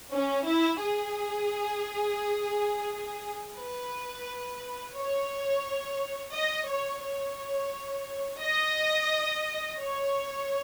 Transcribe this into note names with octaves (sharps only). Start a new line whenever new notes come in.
C#4
E4
G#4
B4
C#5
D#5
C#5
C#5
D#5
C#5